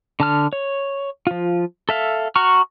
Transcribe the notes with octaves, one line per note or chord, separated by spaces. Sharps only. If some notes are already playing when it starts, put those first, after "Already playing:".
D3 A5 F6
C#5
F3 F4
A4 E5 F5
F#4 A#5 C#6 F6